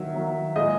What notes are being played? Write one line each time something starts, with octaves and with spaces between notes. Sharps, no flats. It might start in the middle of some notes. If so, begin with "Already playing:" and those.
Already playing: D#3 F#3 A#3 E5
D#3 F#3 A#3
A#2 G#3 D#5